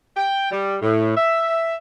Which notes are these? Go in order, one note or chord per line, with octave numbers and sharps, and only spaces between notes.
G5
G3
A2
E5